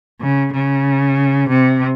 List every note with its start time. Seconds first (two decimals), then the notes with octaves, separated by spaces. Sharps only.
0.21 C#3
0.53 C#3
1.49 C3